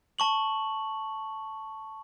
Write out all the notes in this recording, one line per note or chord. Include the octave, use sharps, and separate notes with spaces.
A5 C#6 F#7